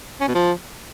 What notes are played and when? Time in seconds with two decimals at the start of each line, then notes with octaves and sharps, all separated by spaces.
0.21 C#4
0.28 B2
0.35 F3